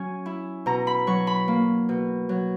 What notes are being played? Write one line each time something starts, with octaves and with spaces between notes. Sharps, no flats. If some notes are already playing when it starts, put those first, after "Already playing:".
Already playing: F#3 C#4 G#5
E4
B2 A#5
B5
F#3 C#6
B5
A#3
B2
F#3